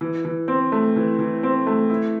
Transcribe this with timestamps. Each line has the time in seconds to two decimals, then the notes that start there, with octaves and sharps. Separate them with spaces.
0.01 E3
0.25 E3
0.48 C4
0.72 A3
0.96 E3
1.19 E3
1.43 C4
1.67 A3
1.90 E4